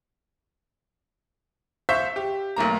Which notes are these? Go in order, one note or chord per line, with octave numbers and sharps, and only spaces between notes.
C5 E5 F5 C#6 G6 B6
G4
B1 A3 A#3 A#5